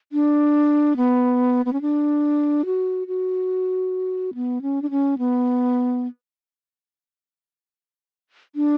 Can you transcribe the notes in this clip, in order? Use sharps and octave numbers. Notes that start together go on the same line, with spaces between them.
D4
B3
B3
C#4
D4
F#4
F#4
B3
C#4
D4
C#4
B3
D4